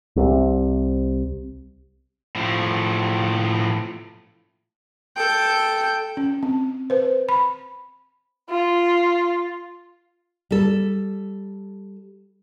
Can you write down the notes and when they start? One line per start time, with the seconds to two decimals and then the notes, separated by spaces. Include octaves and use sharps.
0.16 C2 C3
2.36 A2 F3
5.17 A4 G5
6.17 C#4
6.43 C4
6.90 B4 C5
7.29 B5
8.50 F4
10.51 G3 A4